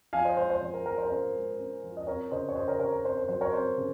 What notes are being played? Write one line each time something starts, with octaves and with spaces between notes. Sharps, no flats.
F3 F5 G#5
C5 D#5
G#3 C5
C5
F3 C5
A#4
F3 A#4
C5
A#4
C#4 C5
G#3
C#4
F3
D#5
C4 A#4 C#5
C#3 C5 D#5
C#5
C#3 C5 D#5
A#4 C#5
C#3 A#4 C#5
A#4
C4 C5
C5
F#3 C5
A#4 C#5
C4 C5
C#3